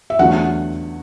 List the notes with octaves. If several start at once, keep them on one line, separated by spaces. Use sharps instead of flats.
E5
E2 D3 F#3 A3 F#5